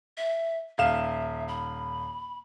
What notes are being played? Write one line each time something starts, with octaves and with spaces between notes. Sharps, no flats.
E5
D#1 E5 F5 E7
B5